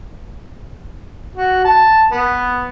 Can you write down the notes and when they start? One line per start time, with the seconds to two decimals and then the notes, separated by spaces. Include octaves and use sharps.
1.36 F#4
1.65 A5
2.12 B3